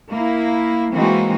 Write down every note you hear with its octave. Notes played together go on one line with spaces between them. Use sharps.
A#3 E4
E3 G#3 A#3 C4 D#4 F#4